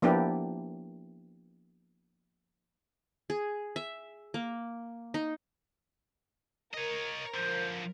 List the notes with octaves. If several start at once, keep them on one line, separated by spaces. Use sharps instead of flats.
F3 A#3 B3 D4 E4 G4
G#4
E5
A#3
D#4
A#4 C#5 D#5
D3 F3 C5